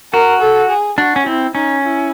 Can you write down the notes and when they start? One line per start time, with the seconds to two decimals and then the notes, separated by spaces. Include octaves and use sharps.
0.13 F#4 A#4
0.42 A4
0.70 G#4
0.98 D4 F#4
1.16 C#4
1.26 C4 E4
1.55 C#4 D#4
1.82 E4